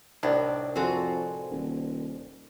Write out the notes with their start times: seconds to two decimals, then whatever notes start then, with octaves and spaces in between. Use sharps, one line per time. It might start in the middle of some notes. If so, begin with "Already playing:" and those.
0.23 C2 A2 D4 D#4 A#4 D5
0.76 F2 C4 F#4 A4 G#5
1.51 D#1